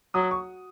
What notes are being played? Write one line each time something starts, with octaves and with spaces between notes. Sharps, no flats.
F#3 D#6
C#6